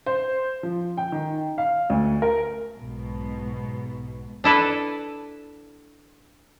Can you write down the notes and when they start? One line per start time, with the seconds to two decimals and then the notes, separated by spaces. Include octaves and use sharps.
0.06 C5
0.63 F3
0.97 G5
1.12 D#3
1.58 F5
1.90 D2
2.22 A#4
2.76 B1 G#2 B2
4.44 D4 E4 A4 B4